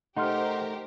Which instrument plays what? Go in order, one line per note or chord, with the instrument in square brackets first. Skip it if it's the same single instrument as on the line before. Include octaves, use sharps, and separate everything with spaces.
[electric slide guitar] A3 D#4 [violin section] G4 A#4 C5 [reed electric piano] F#5 C6 F6